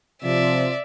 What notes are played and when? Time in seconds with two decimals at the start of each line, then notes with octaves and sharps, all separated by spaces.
0.23 C3 F3 D5 E5